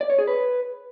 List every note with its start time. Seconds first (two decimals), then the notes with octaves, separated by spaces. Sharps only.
0.01 D5
0.10 C#5
0.19 G#4
0.27 B4